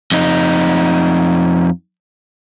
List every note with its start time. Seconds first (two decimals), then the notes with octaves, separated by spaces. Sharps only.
0.12 F2 D#4